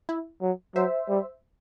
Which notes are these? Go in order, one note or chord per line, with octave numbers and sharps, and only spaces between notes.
E4
F#3
F#3 C5 E5
G3